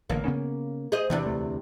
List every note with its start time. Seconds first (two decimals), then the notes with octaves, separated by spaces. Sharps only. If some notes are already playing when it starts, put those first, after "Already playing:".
0.10 A1 D3 A#3
0.25 C#3 B3 C#4
0.92 G#4 C5 D#5
1.10 E2 C3 E3 D4
1.26 D2 A3